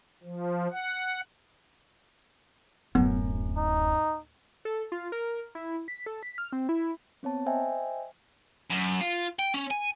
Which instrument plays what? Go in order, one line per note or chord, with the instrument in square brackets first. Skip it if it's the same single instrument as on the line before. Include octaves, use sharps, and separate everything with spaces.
[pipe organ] F3
F#5
[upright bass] D1 [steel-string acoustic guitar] F#2 [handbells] B3
[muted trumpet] D#4
[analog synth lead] A4
F4
A#4
E4
B6
A4
B6
F6
C4
E4
[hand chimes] B3 C4 C#5 A5
C5 D#5 E5 G5 G#5
[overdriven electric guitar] F#2
F4
G5
C#4
G#5